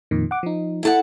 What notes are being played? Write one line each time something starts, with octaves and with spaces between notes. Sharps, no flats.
F2 A#2 D#3
F#5 D6
F3 D#4
E4 A4 F#5